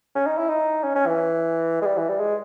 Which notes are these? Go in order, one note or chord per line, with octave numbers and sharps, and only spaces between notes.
C#4
D#4
E4
D#4
C#4
C#4
E3
G#3
G3
E3
G3
G#3